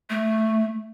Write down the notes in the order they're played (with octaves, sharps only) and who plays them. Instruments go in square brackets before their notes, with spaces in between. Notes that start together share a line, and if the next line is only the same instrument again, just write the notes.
[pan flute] A3